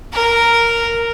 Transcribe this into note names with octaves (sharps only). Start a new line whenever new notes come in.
A#4